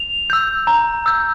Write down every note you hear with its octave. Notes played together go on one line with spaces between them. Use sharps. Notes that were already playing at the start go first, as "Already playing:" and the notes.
Already playing: F7
E6 G6
A#5
E6 G6